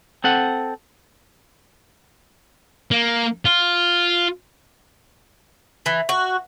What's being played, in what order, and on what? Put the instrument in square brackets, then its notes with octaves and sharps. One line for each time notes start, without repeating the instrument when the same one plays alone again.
[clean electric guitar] C4 A4 F#5
[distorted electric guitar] A#3
F4
[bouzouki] E3
F#4